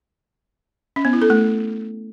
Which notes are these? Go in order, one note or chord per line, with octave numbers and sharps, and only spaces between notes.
C#4
B3
E4
A4
A3